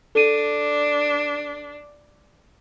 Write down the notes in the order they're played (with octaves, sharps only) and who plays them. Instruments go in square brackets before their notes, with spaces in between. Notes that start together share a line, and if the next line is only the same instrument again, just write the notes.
[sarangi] D4 [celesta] A4 D#7